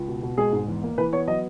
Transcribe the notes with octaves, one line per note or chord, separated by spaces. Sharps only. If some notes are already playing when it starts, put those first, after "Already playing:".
Already playing: C#2
B2
B2
G#3 G#4
G#2
E2
A#3
E3 B4
B3 C#5
F#3 D#5